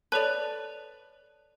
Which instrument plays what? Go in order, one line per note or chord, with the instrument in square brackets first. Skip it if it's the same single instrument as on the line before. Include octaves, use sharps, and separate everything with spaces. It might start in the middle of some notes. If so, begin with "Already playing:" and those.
[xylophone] A4 C#5 A5 [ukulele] B4 D5